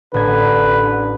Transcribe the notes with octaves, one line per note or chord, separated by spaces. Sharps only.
A1 D3 B4 G#6